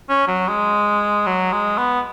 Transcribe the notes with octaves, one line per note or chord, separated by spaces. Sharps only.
C#4
F#3
G#3
F#3
G#3
B3